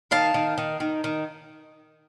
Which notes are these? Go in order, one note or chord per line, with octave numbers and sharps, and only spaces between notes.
D#3 F5 A5
D#3
D#3
D#3
D#3